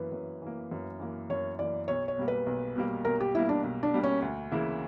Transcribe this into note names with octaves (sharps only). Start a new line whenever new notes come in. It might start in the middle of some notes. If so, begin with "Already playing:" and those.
Already playing: F#2 E3 A#3 B4
F#2
E3 A#3
F#2
E3 A#3
F#2 C#5
E3 A#3 D5
B1 C#5
C#5
B2 G3 A#3
B4
B1
B2 G3 A#3
B1 A#4
G4
B2 G3 A#3 E4
D4
B1
D4
B2 G3 A#3
C#4
D2
C#3 E3 A#3 E4